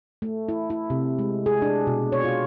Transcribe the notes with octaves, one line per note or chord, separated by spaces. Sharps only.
A3
E4
E4
C3
G#3
G#4
D4
B2
C#5
F4